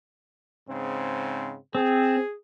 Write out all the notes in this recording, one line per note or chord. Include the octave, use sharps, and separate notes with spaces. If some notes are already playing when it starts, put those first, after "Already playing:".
G#2 C#3 C4
C4 G#4